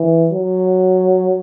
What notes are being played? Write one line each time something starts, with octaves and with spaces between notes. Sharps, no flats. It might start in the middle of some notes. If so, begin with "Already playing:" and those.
Already playing: E3
F#3